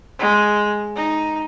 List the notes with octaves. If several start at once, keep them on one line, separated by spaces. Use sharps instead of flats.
G#3
D#4